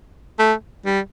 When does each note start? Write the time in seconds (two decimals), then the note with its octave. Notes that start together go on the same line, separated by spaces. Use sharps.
0.39 A3
0.85 G3